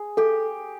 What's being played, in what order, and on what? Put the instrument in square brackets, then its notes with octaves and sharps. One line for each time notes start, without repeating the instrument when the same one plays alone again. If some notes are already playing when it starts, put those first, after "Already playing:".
Already playing: [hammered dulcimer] G#4
[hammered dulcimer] G4 [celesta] A4